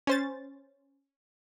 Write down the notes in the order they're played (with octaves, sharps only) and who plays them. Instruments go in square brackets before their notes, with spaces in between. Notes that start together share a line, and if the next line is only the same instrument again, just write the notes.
[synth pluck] C#4 C5 A6